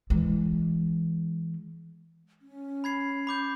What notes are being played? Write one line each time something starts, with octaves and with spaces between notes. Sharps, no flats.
E3 G#3
C#4
B5 G#6 C7
B5 D6 G6